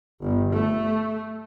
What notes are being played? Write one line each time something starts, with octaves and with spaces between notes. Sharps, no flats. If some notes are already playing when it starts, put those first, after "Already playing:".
G1
A3